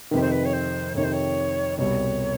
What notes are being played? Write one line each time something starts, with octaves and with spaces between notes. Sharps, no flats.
F2 C3 D#3 B4
C5
B4
C#5
C5
F2 C3 D#3 C#5
C5
C#5
C2 B2 G3 C#5